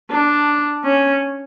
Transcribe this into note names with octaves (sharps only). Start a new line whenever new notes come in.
D4
C#4